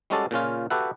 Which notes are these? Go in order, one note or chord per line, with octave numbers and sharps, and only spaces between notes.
G3 G#3 C#4 F#4 A4 D5
A#2 C#3 C#4 F4
F#4 G4 A4 B4 E5 F#5